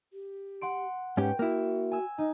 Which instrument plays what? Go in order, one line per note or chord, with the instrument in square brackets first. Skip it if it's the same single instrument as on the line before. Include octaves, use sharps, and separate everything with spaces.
[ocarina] G4
[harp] F#5 C6 D7
[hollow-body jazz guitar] G#2 C#4 G4 [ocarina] B4 [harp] G5
[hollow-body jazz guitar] A#3 E4 [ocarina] F#4
[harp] G#5 E6
[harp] D#4 [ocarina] D#5